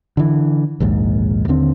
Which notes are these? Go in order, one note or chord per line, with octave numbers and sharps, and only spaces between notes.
D3 E3
A#1 D#2 G#2
D#2 D3 C4